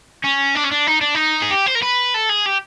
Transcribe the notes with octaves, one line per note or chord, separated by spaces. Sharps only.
C#4
D4
C#4
D4
D#4
D4
D#4
G#4
G4
C5
A#4
B4
A4
G#4
G4